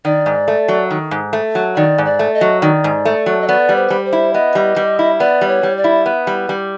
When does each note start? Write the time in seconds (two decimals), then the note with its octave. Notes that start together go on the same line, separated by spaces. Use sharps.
0.05 D#3 D5
0.26 G#2
0.48 A3
0.68 F#3
0.91 D#3
1.11 G#2
1.33 A3
1.55 F#3
1.76 D#3 D5
1.98 G#2
2.05 D5
2.19 A3
2.34 D#5
2.41 F#3
2.62 D#3 D5
2.84 G#2
3.05 A3
3.26 F#3
3.41 D#5
3.47 B3 D5
3.69 G3
3.76 C5
3.90 G3
4.05 C5
4.13 E4
4.34 B3 D#5
4.55 G3
4.76 G3
4.99 E4
5.19 B3 D5
5.41 G3
5.48 C#5
5.63 G3
5.77 D5
5.84 E4
6.06 B3
6.27 G3
6.49 G3